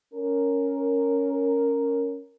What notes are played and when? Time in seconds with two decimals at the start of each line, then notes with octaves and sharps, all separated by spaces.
0.13 C#4 A#4